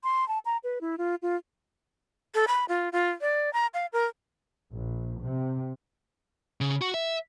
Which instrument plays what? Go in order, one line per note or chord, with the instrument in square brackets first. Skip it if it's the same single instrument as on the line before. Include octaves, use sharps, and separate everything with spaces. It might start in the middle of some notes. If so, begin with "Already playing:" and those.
[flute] C6
A5
A#5
B4
E4
F4
F4
[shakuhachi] A4
B5
F4
F4
D5
A#5
F5
A#4
[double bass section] A#1
C3
[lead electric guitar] C#3
F#4
E5